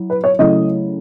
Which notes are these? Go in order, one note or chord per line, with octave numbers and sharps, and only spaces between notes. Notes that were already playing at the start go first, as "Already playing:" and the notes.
Already playing: F#3 E4
B4
C#5
C#3 F#3 A3 E4 D#5